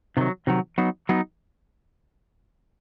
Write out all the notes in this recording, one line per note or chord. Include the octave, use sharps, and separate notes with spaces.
C3 D#3 F#3
C3 D#3 F#3
F#3 B3 D#4
F#3 B3 D#4